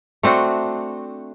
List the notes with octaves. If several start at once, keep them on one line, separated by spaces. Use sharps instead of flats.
A3 C4 D4 F#4